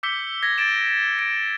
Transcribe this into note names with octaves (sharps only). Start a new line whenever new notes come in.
D6 E6 G6 B6 C#7 G7
G#6 A#6 B6
A6 D7 E7
D7